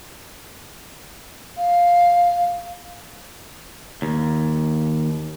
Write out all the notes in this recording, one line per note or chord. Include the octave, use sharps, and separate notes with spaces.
F5
D#2